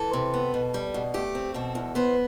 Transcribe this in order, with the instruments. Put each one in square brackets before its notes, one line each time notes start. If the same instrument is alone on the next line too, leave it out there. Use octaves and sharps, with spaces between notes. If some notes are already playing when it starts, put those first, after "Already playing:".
Already playing: [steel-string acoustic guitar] E3 A4
C3
B3
B2
G3
B2
A3 G4
C4
B2 A4
E2
B3 C5